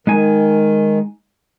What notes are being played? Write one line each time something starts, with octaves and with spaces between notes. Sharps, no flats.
D#3 G#3 D#4 G#5